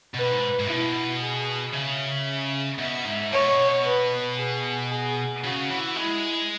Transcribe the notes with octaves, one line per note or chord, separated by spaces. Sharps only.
B2 B4
G#2
G#2
B2 E4
G#4
C#3 E5
B2 E5
G#2
B2 C#5
B4
G#4
G#4
C#3 F#4
E3
G#3 E4